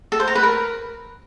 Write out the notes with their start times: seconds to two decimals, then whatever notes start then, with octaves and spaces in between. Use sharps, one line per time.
0.12 A4
0.20 C5
0.28 A#5
0.35 B4
0.43 A#4